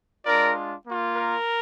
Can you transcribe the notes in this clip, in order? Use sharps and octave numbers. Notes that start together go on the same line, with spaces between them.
G#3 D4 F4 A#4 D5
A#3 F4
A#4